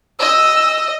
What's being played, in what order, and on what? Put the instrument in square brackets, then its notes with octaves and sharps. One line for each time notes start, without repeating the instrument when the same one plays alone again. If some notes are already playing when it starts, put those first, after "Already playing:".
[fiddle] D#5 [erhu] E6